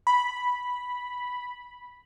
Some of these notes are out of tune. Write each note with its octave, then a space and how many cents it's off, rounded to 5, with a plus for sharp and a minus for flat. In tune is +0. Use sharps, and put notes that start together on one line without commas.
B5 -5